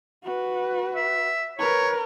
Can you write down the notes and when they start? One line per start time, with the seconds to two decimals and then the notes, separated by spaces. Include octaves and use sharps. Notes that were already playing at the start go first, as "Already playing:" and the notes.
0.24 F#4 B4
0.96 E5
1.59 A#4 B4 C#5